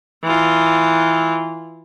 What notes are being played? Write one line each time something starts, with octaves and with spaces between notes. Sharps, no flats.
E3 F4